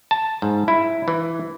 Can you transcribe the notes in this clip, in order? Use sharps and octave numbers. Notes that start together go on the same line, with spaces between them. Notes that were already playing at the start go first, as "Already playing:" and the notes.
A5
G#2
E4
E3